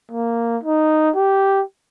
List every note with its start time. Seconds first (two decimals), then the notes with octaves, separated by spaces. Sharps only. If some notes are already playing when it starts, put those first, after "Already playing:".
0.11 A#3
0.63 D#4
1.16 G4